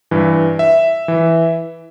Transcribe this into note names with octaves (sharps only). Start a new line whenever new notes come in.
G2 E3
E5
E3